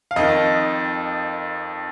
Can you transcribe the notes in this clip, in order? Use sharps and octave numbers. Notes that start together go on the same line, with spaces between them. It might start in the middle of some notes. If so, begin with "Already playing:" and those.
F5
F2 D#3 D#5